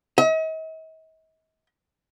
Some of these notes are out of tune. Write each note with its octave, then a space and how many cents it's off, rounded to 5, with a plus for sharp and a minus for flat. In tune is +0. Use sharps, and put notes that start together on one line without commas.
D#5 +45